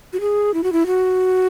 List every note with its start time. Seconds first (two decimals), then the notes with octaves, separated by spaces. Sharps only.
0.13 F#4
0.21 G#4
0.54 E4
0.63 F#4
0.73 E4
0.87 F#4